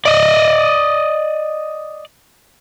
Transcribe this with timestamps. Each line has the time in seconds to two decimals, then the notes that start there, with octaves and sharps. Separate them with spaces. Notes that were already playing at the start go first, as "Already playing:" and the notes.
0.05 D5 D#5